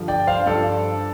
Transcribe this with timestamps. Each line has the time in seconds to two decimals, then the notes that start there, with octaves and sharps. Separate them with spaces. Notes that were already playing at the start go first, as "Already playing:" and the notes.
Already playing: G2 D3 F3
0.08 D5 G5
0.27 C5 F5
0.46 G2 F3 A4 D5